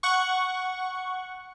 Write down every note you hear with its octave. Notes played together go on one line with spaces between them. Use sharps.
F#5 C#6